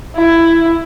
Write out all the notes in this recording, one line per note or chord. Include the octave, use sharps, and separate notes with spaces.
E4